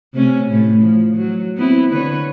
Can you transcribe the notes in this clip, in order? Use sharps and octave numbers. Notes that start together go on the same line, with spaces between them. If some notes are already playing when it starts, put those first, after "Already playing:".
C3 A3 C#4
A2 A3
F3
F#3
B3 C4 E4
D3 B4 C#5